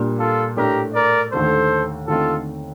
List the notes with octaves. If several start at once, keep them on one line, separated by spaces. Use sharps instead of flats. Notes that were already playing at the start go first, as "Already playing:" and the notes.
Already playing: A#2 G3 A#3 D4
F4 A4
A2 A3 D4 G4 A#4
A#4 D5
D#2 D3 A3 A4 C5
D#2 D3 A3 C4 D#4 F4 A4